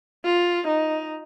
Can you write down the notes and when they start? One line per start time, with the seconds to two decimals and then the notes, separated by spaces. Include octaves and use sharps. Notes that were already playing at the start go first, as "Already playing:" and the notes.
0.25 F4
0.68 D#4